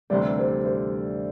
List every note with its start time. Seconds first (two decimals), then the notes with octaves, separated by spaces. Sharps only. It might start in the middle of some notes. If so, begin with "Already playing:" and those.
0.10 D2 C3 E3 G3 D5
0.38 C5
0.65 C5